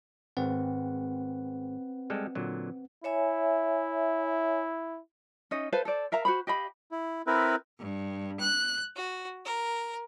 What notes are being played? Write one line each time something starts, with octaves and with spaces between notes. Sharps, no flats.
G#1 C4 B4 F#5
G3 G#3 A4
A#2 D3 F#3
E4 C#5 E5 G#5
C#4 D#4 D#5
A4 B4 C5 F5
A4 C5 D5
A#4 E5 F5 A#5
F#4 C5 B5
G4 D#5 F5 B5
E4
C4 E4 A#4 B4
G2
F#6
F#4
A#4